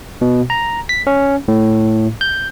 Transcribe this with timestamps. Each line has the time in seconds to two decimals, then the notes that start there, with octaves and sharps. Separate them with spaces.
0.21 B2
0.50 A#5
0.89 B6
1.07 C#4
1.48 A2
2.21 G6